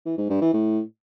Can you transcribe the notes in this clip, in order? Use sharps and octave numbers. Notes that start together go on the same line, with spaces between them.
E3
G#2
G2
E3
A2